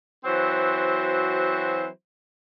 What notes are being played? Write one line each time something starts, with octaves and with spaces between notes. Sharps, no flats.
E3 F#3 C4 F#4 C5